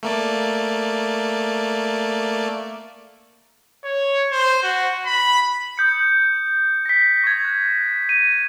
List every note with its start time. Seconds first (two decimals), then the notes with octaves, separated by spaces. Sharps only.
0.03 A3 A#3 D5
3.84 C#5
4.31 C5
4.63 F#4
5.06 B5
5.78 D#6 G6 C#7
6.86 A#6 B6
7.24 C#6 G#6
7.45 F#6
8.09 D#7